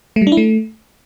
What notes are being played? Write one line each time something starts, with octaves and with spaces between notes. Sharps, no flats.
A3
G3
D4
E4
A3